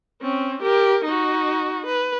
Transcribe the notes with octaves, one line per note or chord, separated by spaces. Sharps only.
C4 C#4
G4 A#4
D#4 F#4
B4